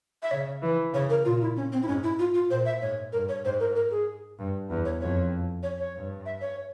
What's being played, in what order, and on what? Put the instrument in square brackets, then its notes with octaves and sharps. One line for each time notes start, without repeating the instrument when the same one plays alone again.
[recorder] E5
[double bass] C#3 [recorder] C#5
[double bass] E3
[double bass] C#3 [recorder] C#5
[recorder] A#4
[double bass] A#2 [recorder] F4
[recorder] E4
C#4
C4
E4
[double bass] G#2 [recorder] C#4
[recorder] E4
F4
F4
[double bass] A#2 [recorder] C5
[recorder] E5
[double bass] G#2 [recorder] C#5
[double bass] G2 [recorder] A#4
[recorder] C#5
[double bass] G#2 [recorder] C5
[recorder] A#4
A#4
G#4
[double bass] G2
E2
[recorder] C#5
[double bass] F2 [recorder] C#5
[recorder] C#5
C#5
[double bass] G2
[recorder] E5
C#5